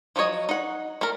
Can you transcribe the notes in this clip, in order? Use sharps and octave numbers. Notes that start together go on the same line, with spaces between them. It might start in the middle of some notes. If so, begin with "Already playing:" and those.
F3 F#3 F#4 C#5 D#5
D#4 F#5
A3 A#4